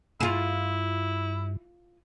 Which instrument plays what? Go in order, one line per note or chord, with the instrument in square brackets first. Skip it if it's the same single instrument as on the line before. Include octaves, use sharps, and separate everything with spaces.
[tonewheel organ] G2 [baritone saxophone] E4 [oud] F4 G#4